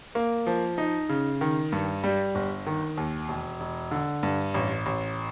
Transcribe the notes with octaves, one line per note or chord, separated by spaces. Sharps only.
A#3
F3
D#4
C#3
D#3
G2
G3
G1
D#3
D#2
E1
E1
D3
G2
A1
A1